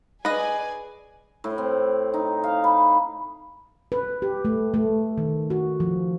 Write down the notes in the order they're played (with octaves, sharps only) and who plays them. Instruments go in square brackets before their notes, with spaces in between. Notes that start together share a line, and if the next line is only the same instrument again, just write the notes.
[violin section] G#4 D5 G#5 [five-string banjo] B4 D#5
[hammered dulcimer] A2
C4
D#4
F5
B5
[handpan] B4
G4
A3
A3
D#3
F#4
F3